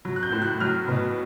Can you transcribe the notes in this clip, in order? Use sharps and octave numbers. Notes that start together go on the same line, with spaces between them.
F#3
F#6
G6
A2
F#6
F#3 F6
B2